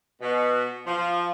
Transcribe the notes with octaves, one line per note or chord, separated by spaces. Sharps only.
B2
F3